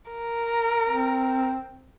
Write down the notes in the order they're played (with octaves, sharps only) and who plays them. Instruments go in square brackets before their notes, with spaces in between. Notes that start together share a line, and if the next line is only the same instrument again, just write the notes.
[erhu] A#4
[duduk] C4